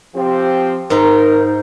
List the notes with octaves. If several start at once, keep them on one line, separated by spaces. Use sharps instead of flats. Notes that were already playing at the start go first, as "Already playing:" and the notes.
F3 C4 G4
G#2 D#4 A#4